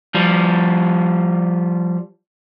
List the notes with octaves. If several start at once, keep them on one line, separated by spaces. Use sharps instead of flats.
F3 G3